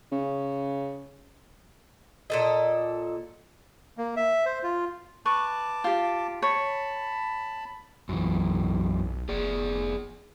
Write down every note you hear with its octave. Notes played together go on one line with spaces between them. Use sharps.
C#3
A#2 A4 D#5
A#3
E5
C5
F4
B4 A5 C#6 D6
F4 G4
C#5 A5 B5
B1 F#2 E3
F1 G#4 D5